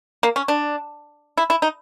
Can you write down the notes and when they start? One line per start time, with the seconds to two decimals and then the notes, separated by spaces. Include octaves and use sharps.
0.23 A#3
0.36 C#4
0.48 D4
1.37 E4
1.50 E4
1.62 D#4